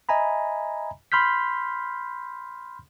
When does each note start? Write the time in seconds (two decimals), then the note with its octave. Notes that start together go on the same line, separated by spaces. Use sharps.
0.09 D#5 E5 G#5 A#5 B5
1.12 B5 C6 F6 G6 B6